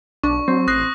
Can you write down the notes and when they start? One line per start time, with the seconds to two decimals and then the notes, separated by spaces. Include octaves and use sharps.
0.23 B1 D4 C#6
0.48 F#3 C4
0.68 A1 D#6 F#6 A#6 C7